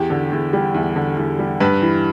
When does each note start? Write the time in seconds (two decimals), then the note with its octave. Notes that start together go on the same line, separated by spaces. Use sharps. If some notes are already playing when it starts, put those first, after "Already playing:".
Already playing: E2 G4
0.10 D3
0.32 E2
0.53 G3
0.75 E2
0.96 D3
1.17 E2
1.39 G3
1.60 G2 B4
1.82 E3